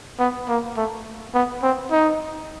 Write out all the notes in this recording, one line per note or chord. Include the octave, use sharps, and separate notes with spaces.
B3
A#3
A3
B3
C4
D#4